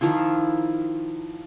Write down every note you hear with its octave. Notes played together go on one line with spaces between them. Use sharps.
D#3 F3 E4 F4